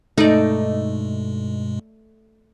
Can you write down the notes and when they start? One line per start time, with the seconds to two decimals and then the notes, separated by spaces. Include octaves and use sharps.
0.18 G2 B2 G#3 A3 D#4 D5